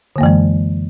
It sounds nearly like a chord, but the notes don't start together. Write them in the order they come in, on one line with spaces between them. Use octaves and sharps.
D3 A#3 F#2 E3 G#3